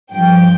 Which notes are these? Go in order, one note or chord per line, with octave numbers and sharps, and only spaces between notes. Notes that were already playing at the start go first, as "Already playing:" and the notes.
G2 F3 G5